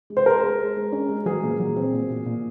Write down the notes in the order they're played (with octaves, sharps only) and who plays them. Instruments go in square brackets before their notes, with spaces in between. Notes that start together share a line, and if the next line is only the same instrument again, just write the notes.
[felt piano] G#3
[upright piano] C5
[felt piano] G#4 [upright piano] A#4
[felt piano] G#3
G#4
G#3
C#4
G#3
[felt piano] F#3 [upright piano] G#4
[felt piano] A#2
F#3
C4
A#2
A#2
A#2